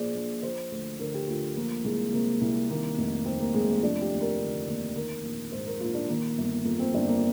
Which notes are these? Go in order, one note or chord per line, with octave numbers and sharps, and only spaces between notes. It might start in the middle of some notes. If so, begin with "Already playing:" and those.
Already playing: A#1 A#2 F3 G#4 C5 D5
A#1
F3 C5
D2
D3 A#4
G4
D2 F4
F3 A#3
C2 G#3
C3 A#3
C2
D#3 A#3
F1
D#2 C4
A#3
F1 G#3
A#3
F3 D4
G4
D#2
A#4
D3
D#2
D#3 A#4
A#1
G#2 C5
A#4
A#1 F4
D4
D#3 A#3
G1
F2 A#3
C4
G1 D4
A#3